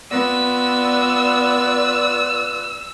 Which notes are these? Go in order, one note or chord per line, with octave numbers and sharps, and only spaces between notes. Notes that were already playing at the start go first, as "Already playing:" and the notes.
B3 F4 B4 D5 E6